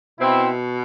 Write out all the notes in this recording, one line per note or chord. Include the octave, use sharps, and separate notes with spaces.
B2 C4 E4